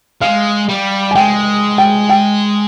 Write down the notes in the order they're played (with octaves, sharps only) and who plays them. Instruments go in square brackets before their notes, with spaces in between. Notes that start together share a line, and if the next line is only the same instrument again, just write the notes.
[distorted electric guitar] G#3 [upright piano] F5
[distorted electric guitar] G3
[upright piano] G#5
[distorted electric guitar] G#3 [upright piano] G5
[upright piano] G5
G5